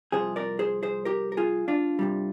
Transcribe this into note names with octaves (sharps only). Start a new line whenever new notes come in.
C2 C3 F3 G#4 C5
A#4 D5
G#4 C5
G#4 C5
G4 A#4
A#4
F4 G#4
D4 F4
C2 C3 G3